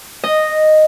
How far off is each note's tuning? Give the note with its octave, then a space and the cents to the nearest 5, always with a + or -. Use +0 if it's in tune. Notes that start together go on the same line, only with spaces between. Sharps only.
D#5 -5